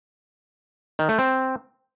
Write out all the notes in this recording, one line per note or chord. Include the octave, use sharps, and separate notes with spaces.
D#3
A3
C4